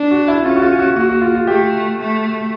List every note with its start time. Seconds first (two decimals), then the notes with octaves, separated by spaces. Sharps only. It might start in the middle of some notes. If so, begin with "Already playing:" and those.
Already playing: D4
0.11 F#4
0.28 E4
0.45 C#4 F4
0.56 F#4
0.62 F4
0.79 F#4
0.96 A#3 F#4
1.09 F#4
1.21 F4
1.35 F4
1.47 A3 G4
1.99 A3